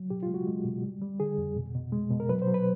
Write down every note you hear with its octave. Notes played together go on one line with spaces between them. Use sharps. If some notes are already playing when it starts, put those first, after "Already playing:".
Already playing: F#3
B2 G4
F4
G#3
F#4
G#3
B2
G3
G3
D3 G#4
F2
B2
B2
G#3
B2
A#4
F#3 B4
C5
F#3
B4